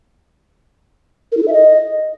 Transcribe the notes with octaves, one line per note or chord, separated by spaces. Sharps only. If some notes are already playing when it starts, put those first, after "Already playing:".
A#4
E4
A4
E5
D#5